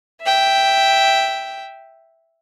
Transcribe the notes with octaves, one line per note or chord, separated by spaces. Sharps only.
E5 G5